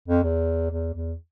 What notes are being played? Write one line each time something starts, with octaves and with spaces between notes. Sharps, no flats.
F2
E2
E2
E2